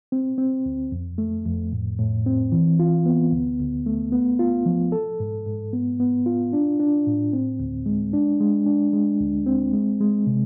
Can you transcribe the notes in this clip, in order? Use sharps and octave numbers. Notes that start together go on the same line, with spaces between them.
C4
C4
D2
F2
A3
F2
A2
A2
C4
E3
F4
B3
D2
D2
A3
B3
F4
F3
A4
G#2
G#2
B3
B3
F4
D4
D4
A2
C4
D2
G#3
D4
G#3
D4
G#3
D2
C4
G#3
G#3
C3